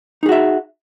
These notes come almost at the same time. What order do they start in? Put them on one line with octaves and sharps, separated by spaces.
D#4 G#4 F#4 E5